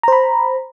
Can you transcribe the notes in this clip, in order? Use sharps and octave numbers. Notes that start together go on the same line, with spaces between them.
C5 A#5 B5